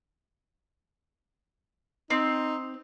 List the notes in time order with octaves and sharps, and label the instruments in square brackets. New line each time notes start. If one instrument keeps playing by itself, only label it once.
[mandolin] C4 [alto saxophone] D#4